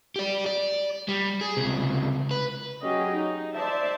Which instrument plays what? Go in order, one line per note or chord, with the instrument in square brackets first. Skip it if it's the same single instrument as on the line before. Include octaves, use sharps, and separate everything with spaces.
[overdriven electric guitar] G4 D5
D5
G3
G#4
C#2 C3
B4
[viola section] F#3 C#4 G4 G#4 D#5
D#4
C5 D5 E5 A5